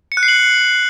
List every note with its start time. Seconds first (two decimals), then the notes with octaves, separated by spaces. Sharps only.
0.12 C#7
0.17 F#6
0.23 C7
0.28 F#7